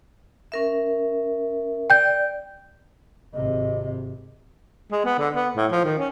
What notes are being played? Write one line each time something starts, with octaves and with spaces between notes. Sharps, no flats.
C#4 A#4 E5
D5 G5 G6
G#1 C3 D#5
G#3
B3
D3
B3
A2
F3
D#3
C#4